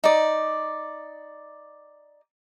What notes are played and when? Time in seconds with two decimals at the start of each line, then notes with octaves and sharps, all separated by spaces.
0.04 D#4 D5